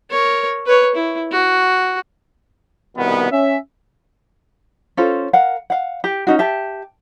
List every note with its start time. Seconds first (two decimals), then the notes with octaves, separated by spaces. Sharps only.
0.11 A#4 C#5
0.66 B4 C#5
0.95 E4
1.31 F#4
2.97 C2 B2 D#3 B3
3.32 C#4 E5
4.97 C#4 F4 A4 C5
5.33 A#4 F5 F#5
5.70 F5 F#5
6.04 G4
6.27 C#4 D#4 F#4
6.39 G4 E5 A5